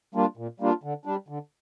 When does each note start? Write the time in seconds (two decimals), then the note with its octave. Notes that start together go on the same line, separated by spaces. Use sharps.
0.15 G3 A#3 D4 F4
0.37 A#2
0.60 G3 A#3 D4 F4
0.83 D3
1.05 G3 D4
1.28 D3